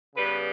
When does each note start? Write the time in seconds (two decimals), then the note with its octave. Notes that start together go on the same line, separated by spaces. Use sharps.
0.16 C#3 G3 B3 B4